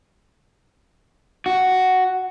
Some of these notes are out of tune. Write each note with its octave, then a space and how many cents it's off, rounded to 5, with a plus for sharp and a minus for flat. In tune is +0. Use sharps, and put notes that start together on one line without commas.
F#4 +5